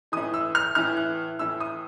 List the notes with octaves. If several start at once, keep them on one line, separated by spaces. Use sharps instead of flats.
A2 E3 D#6
E6
F6
A2 E3 F6
F#6
A2 E3 E6
D#6